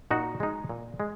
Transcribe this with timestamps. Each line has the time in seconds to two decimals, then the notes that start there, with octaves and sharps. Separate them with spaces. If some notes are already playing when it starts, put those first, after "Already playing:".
0.11 A#2 D#4 F#4
0.40 G#3 D#4
0.69 A#2
1.00 G#3